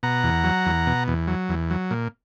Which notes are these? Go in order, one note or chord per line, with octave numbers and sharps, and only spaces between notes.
B2 F#5 A#5
E2
F#3
E2
B2
E2
F#3
E2
F#3
A#2